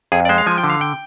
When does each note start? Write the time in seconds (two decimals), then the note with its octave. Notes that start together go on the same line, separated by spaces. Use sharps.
0.12 F2 G#4
0.25 D5
0.29 G#3 C5
0.38 F5
0.47 F3 G#5
0.58 G5
0.64 D3
0.69 F5
0.81 G5